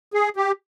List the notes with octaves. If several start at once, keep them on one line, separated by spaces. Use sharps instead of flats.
G#4
G4